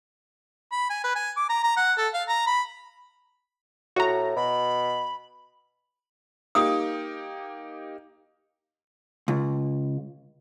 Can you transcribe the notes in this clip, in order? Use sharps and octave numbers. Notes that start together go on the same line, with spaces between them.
B5
G#5
B4
G#5
D6
A#5
A#5
F#5
A4
F5
A#5
B5
A2 F#4 A#5
B2 B5
A#3 D#4 G4 D#6
C#2